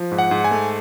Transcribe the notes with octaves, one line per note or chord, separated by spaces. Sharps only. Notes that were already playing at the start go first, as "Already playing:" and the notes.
Already playing: F3
G#2
F#5
G#2
G#5
A3